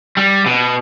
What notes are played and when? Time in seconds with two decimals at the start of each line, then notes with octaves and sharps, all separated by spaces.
0.17 G3
0.46 B2